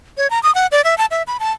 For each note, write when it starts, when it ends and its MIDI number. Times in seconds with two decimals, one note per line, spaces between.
0.17 0.30 73
0.30 0.42 82
0.43 0.54 87
0.55 0.67 78
0.72 0.81 74
0.84 0.97 76
0.98 1.06 81
1.11 1.23 76
1.27 1.38 83
1.40 1.52 81